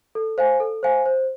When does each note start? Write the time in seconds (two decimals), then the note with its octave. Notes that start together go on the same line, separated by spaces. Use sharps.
0.15 A4
0.38 C5 F5 G#5
0.60 A4
0.83 C5 F5 G#5
1.06 C5